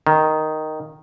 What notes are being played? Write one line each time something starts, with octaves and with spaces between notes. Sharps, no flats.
D#3